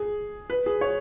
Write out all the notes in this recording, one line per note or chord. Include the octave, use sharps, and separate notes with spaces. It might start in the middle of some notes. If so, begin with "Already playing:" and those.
Already playing: G#4
B4
G#4
C#5